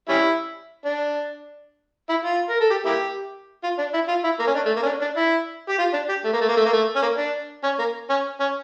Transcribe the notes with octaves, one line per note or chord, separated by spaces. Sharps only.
G3 C#4 E4
D4
E4
F4
A#4
A4
G4
A#3 E4 G4
F4
D4
E4
F4
E4
A#3
C#4
D4
A3
A#3
C#4
D4
D4
E4
G4
F4
D4
G4
A3
A#3
A3
A#3
A3
A#3
A3
C#4
A#3
D4
C#4
A#3
C#4
C#4